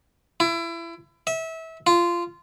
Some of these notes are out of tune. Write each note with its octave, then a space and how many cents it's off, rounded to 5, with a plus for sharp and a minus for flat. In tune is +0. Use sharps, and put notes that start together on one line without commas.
E4 +30
E5 -25
F4 -15